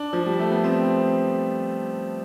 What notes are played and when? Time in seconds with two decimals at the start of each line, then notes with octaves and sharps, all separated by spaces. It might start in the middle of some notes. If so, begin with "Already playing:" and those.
Already playing: D4
0.13 F3
0.26 G3
0.39 A3
0.52 B3
0.64 C4